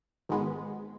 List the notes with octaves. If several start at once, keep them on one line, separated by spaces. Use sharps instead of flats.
G#1 G#2 G#3 B3